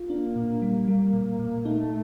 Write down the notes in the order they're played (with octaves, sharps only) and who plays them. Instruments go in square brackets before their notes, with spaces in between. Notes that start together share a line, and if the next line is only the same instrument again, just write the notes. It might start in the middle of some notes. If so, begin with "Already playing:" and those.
Already playing: [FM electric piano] F4
[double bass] A#3 [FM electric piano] D4
[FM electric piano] A#2
G3
[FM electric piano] G3 [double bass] A#3
[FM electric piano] A#2
A#2
[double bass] A3 [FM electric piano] D#4